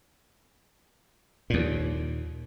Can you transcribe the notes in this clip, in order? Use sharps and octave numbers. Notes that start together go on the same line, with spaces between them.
D#2 A#2